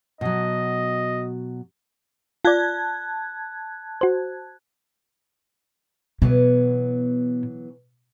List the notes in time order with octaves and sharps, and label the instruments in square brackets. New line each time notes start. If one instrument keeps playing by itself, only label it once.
[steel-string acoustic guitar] B2 F#3 [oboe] D#5
[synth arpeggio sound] F4 D5 [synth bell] A5 F#6 G#6
[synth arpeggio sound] F#4 C5
[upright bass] B2 [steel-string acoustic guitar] E3 F#3 B3